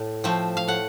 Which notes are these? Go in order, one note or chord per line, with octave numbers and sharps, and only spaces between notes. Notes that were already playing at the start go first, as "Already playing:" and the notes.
Already playing: A2
F3 A3 C4
F5
A2 F#5